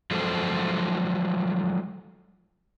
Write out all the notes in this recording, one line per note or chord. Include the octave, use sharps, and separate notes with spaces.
F3 F#3 G#3 G#4 A4 C5